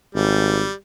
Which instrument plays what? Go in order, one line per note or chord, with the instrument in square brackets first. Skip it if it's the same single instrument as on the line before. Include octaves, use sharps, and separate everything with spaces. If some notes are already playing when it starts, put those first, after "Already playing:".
[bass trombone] G#1 [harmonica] G3